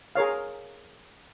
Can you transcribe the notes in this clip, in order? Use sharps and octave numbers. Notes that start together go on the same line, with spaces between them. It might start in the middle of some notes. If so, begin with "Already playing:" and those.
G#4 A#4 C#5 F5